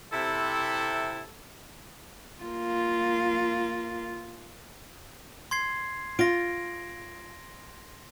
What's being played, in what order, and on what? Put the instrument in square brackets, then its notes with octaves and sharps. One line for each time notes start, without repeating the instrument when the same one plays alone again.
[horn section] C3 E4 [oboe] A4
[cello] A#3 F4
[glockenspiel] C6 G#6 C7
[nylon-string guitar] F4 [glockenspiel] A#6 D7